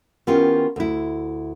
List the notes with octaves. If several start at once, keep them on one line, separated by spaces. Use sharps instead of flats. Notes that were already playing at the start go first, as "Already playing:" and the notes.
D#3 B3 C#4 E4 F4 G4
D2 E4